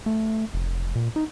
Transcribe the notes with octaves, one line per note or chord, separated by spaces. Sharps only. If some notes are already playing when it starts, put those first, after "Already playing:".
A3
F1
A#2
D#4